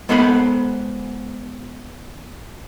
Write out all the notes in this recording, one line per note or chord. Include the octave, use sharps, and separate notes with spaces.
G#3 B3 A4 C5 A5 B5